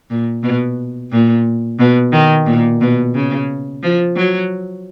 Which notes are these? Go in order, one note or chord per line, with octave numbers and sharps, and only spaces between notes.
A#2
B2
A#2
B2
D#3
A#2
B2
C#3
F3
F#3